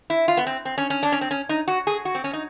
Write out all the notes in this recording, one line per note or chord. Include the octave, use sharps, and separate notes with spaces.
E4
F4
B3
C4
C4
C#4
C#4
D4
C#4
C4
C#4
D#4
F#4
G#4
F#4
C4
C#4
D#4